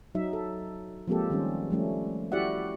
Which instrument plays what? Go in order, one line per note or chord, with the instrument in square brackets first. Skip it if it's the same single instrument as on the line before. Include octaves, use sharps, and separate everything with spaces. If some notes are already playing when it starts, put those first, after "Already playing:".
[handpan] F#3 D#4 E5
A4
F3 G#3 A#3 C4 G4 A4
D#3 G3 C#4
F3 G3 A3 C#4
E4 F#4 G4 D5 E5 F#5